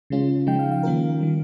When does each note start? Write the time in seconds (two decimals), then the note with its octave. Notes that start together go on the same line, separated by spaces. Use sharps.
0.10 C#3 G#3 C#4 F4
0.47 C#3 F3 G#3 D#4 G5
0.59 F5
0.71 F5
0.83 D#3 A#3 C#4 F4 A#4
1.20 D#3 G3